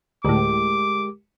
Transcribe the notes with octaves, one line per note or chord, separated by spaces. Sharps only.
D2 A2 G#3 G4 A#4 D6